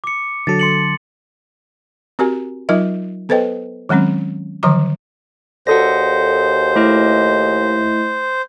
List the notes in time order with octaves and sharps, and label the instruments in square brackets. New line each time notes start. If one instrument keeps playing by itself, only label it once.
[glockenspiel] D6 C#7
[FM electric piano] D3 F#3 A4 [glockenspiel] A6
[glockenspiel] C6 C#7 F#7
[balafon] C4 F#4 G4 A#4 G#5
F#3 D#4 F4 A#4 D#5 E5
B3 A4 B4 C5 D#5 G5
D#3 F#3 G#3 C4 C#4
D3 D#3 F3 F#3 A#5 D6
[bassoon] D#2 [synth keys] F#4 A4 D5 [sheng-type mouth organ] C5 [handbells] F#5 D#6 A#6
[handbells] A3 E4 D#5